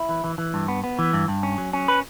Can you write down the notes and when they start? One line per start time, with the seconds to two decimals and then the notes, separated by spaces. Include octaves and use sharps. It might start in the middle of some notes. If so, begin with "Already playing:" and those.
Already playing: E4
0.09 E3
0.24 E3
0.38 E3
0.54 G2
0.68 B3
0.84 B3
0.99 E3
1.13 G2
1.28 G2
1.43 C#4
1.58 F#3
1.73 C#4
1.88 B4